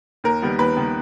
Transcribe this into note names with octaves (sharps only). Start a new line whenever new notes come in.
D#2 A#4
D#3 G3 B3
D#2 B4
D#3 G3 B3